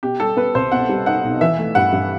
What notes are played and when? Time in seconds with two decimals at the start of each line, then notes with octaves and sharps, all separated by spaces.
0.03 B2 G4
0.20 G3 A4
0.37 B3 B4
0.55 C2 C5
0.72 B2 F#5
0.89 G3
1.06 D#4 F#5
1.24 B1
1.41 E3 E5
1.58 A3
1.75 G2 F#5
1.92 G2